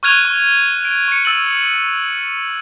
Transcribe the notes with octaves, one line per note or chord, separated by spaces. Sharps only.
C#6 F6 F#6 G#6 D#7 F7
C#6
D7
C#6 C#7
E6 A6 D#7 F#7